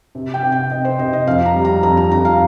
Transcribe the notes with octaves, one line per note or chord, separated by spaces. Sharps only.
C3
G5
C3
G5
C3 D#5
C5
C3 D#5
D#5
F2 F5
A#5
G3
A#5
F2 A#5
A#5
F2 A#5
F5